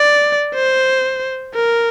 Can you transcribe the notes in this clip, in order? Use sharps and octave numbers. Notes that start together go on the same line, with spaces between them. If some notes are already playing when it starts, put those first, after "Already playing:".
Already playing: D5
C5
A#4